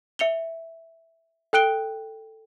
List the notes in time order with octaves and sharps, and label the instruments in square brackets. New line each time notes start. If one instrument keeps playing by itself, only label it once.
[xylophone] E5 C#7 F7 G7
A4 G5 F#6 D7 G7